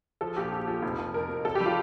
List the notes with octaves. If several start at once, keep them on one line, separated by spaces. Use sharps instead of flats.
F3 A4
A#1 G4
A#1
F3
F1
F1
F2 A#4
F2
F1 A4
G4
G3
F4